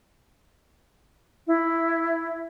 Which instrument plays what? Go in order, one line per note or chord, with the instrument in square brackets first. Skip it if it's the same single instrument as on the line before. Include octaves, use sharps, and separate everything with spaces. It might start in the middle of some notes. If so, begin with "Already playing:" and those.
[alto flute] E4